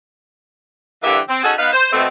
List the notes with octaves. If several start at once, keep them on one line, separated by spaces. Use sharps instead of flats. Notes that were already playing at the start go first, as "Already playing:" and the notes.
G2 D3 E3 A#3 G4 E5
C4
C#4 D#4 F#4 G#4 A4
B3 D#4 B4 F5
C5
B2 A3 C4